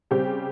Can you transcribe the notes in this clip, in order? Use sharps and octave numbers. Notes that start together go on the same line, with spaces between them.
C#3 G3 C4 G4